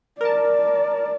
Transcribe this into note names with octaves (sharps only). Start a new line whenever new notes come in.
A#4 D5 A5